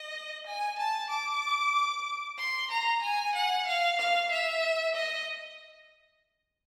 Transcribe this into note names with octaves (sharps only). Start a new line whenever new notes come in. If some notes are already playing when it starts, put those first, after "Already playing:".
Already playing: D#5
G#5
A5
D6
C6
A#5
G#5
F#5
F5
F5
E5
D#5